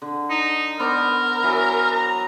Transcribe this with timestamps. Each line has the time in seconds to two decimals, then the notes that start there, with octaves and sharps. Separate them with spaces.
0.02 D3
0.30 D#4
0.79 B3 A#4 C5 D5
1.43 E3 F#3
1.92 A#5